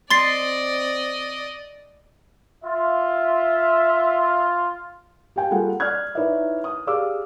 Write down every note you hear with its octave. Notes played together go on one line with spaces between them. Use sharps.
C4 D5 D#5 C6 A6 C7
F4 E5
G4 F5 G5 G#5
G3 A#3 F4 G#4 A4 F#5
D5 F6 F#6 G#6
D#4 E4 B4 C#5 D5 E5
D#6
G4 G#4 D5 F5 D6 E6